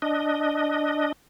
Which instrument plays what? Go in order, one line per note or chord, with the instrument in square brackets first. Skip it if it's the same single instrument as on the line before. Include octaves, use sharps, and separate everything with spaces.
[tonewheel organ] D4 D#5